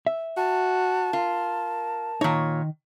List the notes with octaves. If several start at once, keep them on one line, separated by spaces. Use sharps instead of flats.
E5
F#4 A5
F4 A#4
A#2 D#3 D#4 C#5